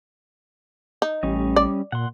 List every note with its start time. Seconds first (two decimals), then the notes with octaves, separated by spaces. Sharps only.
1.02 D#4
1.23 A1 G3 C#4 D#5
1.56 D5
1.92 A#2 F#5 C6